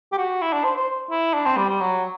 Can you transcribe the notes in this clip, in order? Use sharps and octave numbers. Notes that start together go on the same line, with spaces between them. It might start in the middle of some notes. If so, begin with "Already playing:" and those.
G4
F#4
E4
D4
C5
C5
E4
D4
C4
G3
G3
F#3